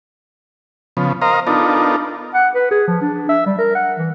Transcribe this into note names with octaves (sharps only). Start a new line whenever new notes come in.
C#3 F3 B3
A#4 C5 D#5 F5 A#5
B3 D4 D#4 F4 A4 A#4
F#5
B4
G#4
F3
D4
E5
G3
A#4
F#5
E3